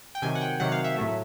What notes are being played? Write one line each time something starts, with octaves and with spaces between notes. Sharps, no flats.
G5
C3 D#3 F#3 G#5
F#5
G5
C3 D#3 F#3 F#5
F5
E5
A2 F#3 A3 E5